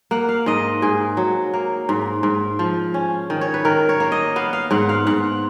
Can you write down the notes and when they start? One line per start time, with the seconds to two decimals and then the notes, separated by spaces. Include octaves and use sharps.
0.11 A#3 F#5
0.29 F5
0.46 G#2 D#5
0.82 G#2 G#4
1.17 F#3
1.54 A#3
1.89 G#2
2.23 G#2
2.59 F3
2.94 C#4
3.30 D#3
3.41 C#5
3.54 B4
3.65 D#3 A#4
3.89 C#5
4.00 A#3
4.12 D#5
4.36 B3 F5
4.53 F5
4.71 G#2 F#5
4.89 F5
5.07 G#2 F#5